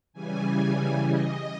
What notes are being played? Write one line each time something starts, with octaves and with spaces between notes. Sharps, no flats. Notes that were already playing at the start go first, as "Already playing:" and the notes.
C#3 E3 G3 G#5
D#5